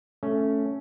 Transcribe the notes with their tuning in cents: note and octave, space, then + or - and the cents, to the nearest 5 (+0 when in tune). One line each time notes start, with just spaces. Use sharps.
A3 +0 C#4 +0